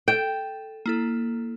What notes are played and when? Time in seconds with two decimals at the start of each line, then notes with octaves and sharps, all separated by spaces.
0.08 A4 G5
0.86 A#3 E4 A4